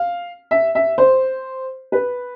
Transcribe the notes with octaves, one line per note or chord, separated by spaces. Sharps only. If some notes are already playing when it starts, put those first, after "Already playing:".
Already playing: F5
E5
E5
C5
B4